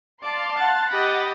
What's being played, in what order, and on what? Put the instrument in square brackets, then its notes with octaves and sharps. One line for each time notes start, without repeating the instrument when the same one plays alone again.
[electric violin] D5 [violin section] F5 A5 C6
[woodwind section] F#5 [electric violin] A6
[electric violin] G4 D#5 [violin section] B5 A6 A#6